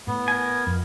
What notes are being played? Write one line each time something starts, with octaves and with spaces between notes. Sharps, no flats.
A2 B3
A#4 G#5
F2